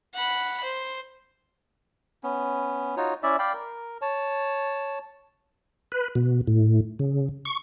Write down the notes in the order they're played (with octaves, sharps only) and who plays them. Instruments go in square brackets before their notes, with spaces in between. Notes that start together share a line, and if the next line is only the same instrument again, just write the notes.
[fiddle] F#5 B5
C5
[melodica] B3 C#4
D#4 F4 F#4 C#5
C#4 E4 D5 E5
D5 F5 G5 B5
A#4
C#5 A5
[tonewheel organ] B4
B2
A2
C#3
C#6